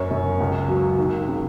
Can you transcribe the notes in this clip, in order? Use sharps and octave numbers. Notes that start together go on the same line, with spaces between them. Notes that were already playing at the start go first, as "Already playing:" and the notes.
Already playing: F#2 C#5
F#2
C#2
F#3
D#2
C#3